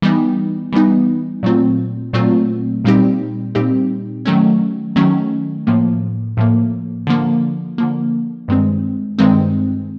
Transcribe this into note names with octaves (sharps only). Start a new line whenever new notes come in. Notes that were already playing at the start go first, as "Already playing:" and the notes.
E3 G3 B3 D#4
E3 G3 B3 D#4
A#2 F#3 A3 C4 F4
A#2 F#3 A3 C4 F4
A#2 G3 C4 D#4 G4
A#2 G3 C4 D#4 G4
D#3 F#3 A3 C#4
D#3 F#3 A3 C#4
A2 F3 A#3
A2 F3 A#3
D3 F3 A#3
D3 F3 A#3
G2 D#3 G#3 C4
G2 D#3 G#3 C4